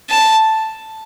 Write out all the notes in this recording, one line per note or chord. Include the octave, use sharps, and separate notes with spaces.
A5